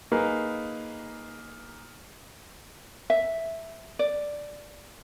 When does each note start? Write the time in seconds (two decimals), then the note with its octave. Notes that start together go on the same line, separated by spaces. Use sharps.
0.12 A#3 D#4 G#4 A#4 B4
3.10 E5
3.99 D5